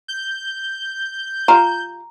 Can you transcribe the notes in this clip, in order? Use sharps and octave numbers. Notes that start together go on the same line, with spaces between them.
G6
F4 G4 A#5